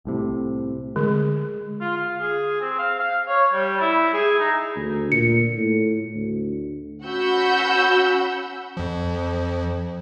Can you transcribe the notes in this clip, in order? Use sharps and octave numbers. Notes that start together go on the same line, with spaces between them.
C2 A2 C3
D3 G#3
F4
F5
G#4
C4
F5
F5
C#5
G3
E4
G#4
D#4
D2
A#2 C#7
A2
D2
C#4 F#4 F#5 B5 E6 G6
F2 F3